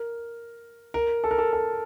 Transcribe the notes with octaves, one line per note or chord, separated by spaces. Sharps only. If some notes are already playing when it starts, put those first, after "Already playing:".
Already playing: A#4
A#4
A4
A#4
A4
A4